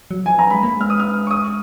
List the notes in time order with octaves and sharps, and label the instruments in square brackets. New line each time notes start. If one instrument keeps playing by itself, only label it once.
[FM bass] F#3
[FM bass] F3 [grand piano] G#5
[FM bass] F#3 [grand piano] A#5
[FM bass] G#3 [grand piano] B5
[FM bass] A#3
[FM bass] G#3 [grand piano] F6
[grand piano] D#6
F6
C#6
D#6